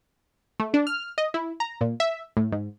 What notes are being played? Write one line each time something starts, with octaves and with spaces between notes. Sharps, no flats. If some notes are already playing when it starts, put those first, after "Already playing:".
A3
D4
F6
D#5
E4
A#5
A#2
E5
A2
G#2